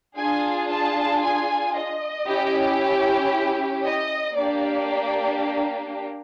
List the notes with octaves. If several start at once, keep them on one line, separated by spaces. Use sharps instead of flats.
D4 F4 G#4 G#5
A5
G#5
D#5
C#4 E4 G4
D#5
A#3 D4 G4 D5